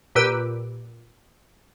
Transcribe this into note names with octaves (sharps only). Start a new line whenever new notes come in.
A#2 G4 B4 E6 D7